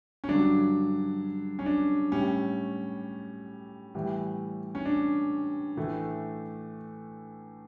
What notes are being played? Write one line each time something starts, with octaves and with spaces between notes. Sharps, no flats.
C#4
G2 D3 F#3 D4
C#4
D4
A2 G3 C#4
A2 E3 G3
C#4
D4
A2 E3 A3